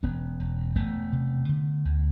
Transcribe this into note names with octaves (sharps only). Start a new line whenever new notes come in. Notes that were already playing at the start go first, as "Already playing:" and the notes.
E1 B3 C#4
E1
E1 A3 B3
C3
D3
D2